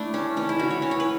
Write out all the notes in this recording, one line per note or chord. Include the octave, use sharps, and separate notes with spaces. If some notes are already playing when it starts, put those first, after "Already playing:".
Already playing: A3 D4 E4
C#4
E3 C#4
E4
E3 F#4
C#5
C#4
C#5
B4